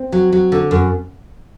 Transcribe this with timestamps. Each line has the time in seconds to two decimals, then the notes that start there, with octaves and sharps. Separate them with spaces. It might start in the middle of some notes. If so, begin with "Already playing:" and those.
Already playing: C4
0.12 F#3
0.32 F#3
0.52 D3
0.71 F#2